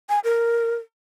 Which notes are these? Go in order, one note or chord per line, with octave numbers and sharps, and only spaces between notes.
G#5
A#4